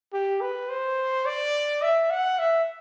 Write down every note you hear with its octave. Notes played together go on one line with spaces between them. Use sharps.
G4
B4
C5
D5
E5
F#5
E5